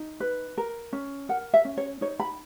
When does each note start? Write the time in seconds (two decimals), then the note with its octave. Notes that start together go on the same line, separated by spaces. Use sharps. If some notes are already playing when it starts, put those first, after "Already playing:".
Already playing: D#4
0.20 B4
0.58 A#4
0.93 C#4
1.29 A#4 F#5
1.54 E5
1.65 C#4
1.77 C#5
2.01 D#4 C#5
2.20 B5